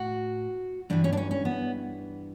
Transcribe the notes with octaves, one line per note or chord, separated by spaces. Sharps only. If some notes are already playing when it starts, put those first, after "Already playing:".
Already playing: A2 F#4
G2 E3 D4
C#4
D4
C#4
C#4
B3